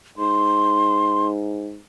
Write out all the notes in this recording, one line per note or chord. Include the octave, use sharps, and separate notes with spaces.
G#2 C6